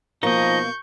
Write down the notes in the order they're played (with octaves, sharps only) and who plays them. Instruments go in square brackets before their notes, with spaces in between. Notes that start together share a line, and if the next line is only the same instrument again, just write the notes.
[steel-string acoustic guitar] B2 A#3 [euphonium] F3 [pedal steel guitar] D#4 D#5 [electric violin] C#6 G6